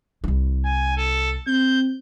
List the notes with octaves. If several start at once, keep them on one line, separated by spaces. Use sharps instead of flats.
C2 E4
G#5
A4
C4 G6